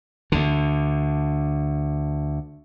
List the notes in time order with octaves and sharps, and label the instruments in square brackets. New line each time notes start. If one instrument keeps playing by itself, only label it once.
[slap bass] D2 D3